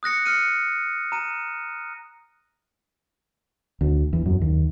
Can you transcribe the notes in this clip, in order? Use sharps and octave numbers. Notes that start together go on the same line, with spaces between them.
D#6 F#6 A#6 C#7
F6 F#6 C#7 D#7
A#5 D#7
D2
E2
F#2
D#2